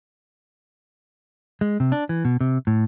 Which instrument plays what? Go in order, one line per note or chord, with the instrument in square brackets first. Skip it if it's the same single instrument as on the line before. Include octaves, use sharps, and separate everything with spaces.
[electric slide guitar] G#3
C3
D4
E3
B2
C3
A2